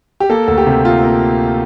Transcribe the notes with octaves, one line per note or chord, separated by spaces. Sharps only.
G4
A#3 A4
D2 A4
G4
C3
A#3 F4
A#3